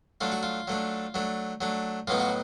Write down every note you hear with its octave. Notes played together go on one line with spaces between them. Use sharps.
F#3 A3 D4 F4
F#4
F4
F#3 A3 D4
F#3 A3 D4
F#3 A3 D4
A2 F#3 B3 D#4 F4
F#4